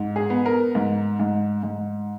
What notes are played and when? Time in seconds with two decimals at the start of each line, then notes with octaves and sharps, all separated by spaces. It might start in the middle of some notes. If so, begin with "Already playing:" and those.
Already playing: G#2
0.16 G#4
0.30 B3
0.46 A#4
0.75 G#2
1.20 G#2
1.63 G#2